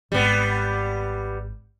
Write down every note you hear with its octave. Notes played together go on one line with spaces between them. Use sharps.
G#1 G3 B3